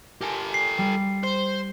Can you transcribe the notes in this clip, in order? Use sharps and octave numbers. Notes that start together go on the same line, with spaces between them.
G4 A4 A#4 G#5 C6
C7
G3
C5